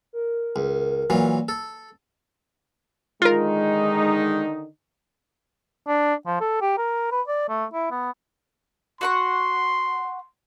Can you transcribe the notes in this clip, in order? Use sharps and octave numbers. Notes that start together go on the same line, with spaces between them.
A#4
C#2
A#2 E3 F#3
A4
D3 D#3 G#3 D#4 F4 A#4
D4
F3
A4
G4
A#4
B4
D5
A3
E4
B3
F#4 F#5 C6 C#6